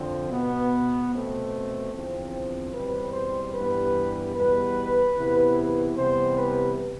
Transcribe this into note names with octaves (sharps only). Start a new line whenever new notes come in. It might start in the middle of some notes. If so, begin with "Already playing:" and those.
Already playing: F2 D3 F3 C4
B2 B3
B2 A3 C4
E2 D3 F3 C4
E2 B2 G3 C4 B4
C5
G2 E3 G3 B3 B4
E2 B2 G3 B3 B4
E2 C3 E3 B3
C3 E3 G3 B3 C5
B4